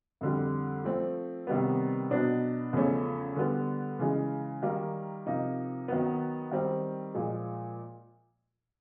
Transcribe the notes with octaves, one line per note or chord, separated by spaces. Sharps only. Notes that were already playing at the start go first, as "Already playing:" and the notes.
F2 D3 G3
F3 A3 C4
C3 D#3 G3 B3
B2 F#3 B3 D4
E2 C#3 F3 A3 C#4
D3 G3 B3
C#3 E3 G#3
D#3 G3 A#3
C3 F3 A#3 D#4
D#3 F#3 B3
D#3 G3 C4
A#2 F3 G#3